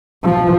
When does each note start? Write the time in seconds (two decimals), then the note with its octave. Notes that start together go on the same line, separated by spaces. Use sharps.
0.23 F3